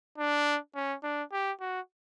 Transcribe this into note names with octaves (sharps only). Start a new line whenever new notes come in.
D4
C#4
D4
G4
F#4